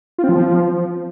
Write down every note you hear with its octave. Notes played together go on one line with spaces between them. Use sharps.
F4
C4
F3